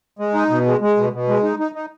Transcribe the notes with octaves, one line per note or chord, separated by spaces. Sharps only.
G#3
D#4
B2
G#3
G#3
B2
B2
G#3
D#4
D#4
D#4